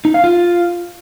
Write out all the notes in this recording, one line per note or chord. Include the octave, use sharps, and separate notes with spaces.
D#4
F5
F4